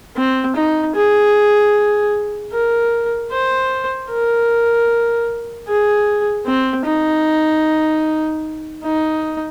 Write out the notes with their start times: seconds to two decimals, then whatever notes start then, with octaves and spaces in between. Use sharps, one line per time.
0.16 C4
0.56 D#4
0.95 G#4
2.52 A#4
3.31 C5
4.10 A#4
5.68 G#4
6.46 C4
6.85 D#4
8.83 D#4